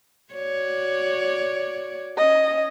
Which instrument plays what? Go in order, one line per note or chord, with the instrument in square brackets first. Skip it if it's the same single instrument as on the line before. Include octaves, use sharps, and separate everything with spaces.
[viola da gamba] F#4 C#5 D5
[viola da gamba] C#4 [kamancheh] D#5